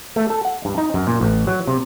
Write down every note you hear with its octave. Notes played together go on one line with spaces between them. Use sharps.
A3
A4
F#5
G2
D#4
F#2
A#2
A1
F#3
C3